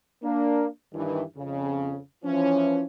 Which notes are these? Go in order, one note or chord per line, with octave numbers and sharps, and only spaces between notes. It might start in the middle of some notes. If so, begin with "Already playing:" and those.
A#3 D4
G2 D#3 E3
F2 C#3
E3 F3 C#4